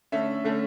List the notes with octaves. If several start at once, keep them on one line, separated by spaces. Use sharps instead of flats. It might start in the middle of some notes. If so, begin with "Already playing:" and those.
D3 A3 C#4 E5
D3 A3 C#4